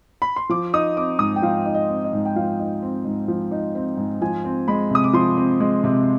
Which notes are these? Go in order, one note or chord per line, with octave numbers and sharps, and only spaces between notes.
B5
C6
F3 D6
D#4 D#6
C4 D6
G#2 D#6
G5
F3 F5
D#4
D#5
C4
D#5
G#2
G5
F3 F5
D#4
C4
G#2
F3
D#4
C4
G#2
F3 G#5
C4
G#3 B5
C3 D#6
D6
F3 C6
C4
G#3
C3